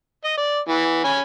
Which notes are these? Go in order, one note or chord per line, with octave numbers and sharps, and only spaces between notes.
D#5
D5
E3 B3
C#4 G#5 B5